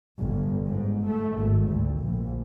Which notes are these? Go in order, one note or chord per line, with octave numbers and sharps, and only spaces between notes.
G1
G#2
A3
G#1
D2
A#1